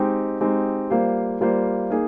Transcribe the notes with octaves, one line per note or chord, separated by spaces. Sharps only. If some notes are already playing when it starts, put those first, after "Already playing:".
Already playing: G#3 C4 D#4 G4
G#3 C4 D#4 G4
G3 A#3 F4 C5
G3 A#3 F4 C5
A#3 D#4 G#4